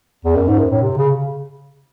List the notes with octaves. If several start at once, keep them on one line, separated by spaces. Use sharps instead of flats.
E2
F#2
G#2
F#2
A2
C3
C#3